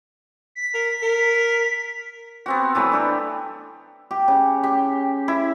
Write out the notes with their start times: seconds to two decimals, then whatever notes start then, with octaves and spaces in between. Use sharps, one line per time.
0.55 B6
0.74 A#4
1.03 A#4
2.46 B3 C4 F#4
2.75 E3 F#3 A3 B5
2.92 D4 G4 A4
4.11 G4
4.28 C#3
4.63 G4
5.28 E4